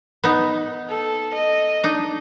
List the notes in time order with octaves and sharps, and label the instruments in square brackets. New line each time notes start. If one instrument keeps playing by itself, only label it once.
[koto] B3 D#4
[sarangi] A4
D#5
[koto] D4 D#4